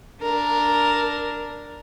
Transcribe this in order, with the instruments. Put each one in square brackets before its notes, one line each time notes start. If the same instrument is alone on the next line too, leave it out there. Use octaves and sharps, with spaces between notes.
[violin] D4 A#4